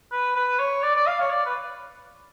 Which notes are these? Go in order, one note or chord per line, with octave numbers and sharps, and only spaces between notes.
B4
B4
C#5
D5
D5
F5
C#5
D5
B4